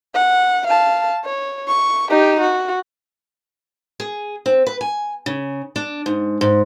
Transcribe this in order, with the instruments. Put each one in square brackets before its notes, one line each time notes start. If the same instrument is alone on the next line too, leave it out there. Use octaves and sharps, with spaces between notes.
[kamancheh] F#5
F5 A5
C#5
C#6
D#4 G4
F#4
[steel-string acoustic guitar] G#4
C4
B4
G#5
C#3
D4
G#2
G#2